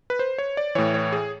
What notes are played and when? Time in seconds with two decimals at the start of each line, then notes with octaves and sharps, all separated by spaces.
0.10 B4
0.19 C5
0.38 C#5
0.57 D5
0.75 A2 E3 C#5
0.94 C#5
1.12 G#4